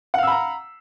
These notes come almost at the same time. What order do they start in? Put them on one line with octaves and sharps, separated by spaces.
F#5 F5 E6 B5 A#5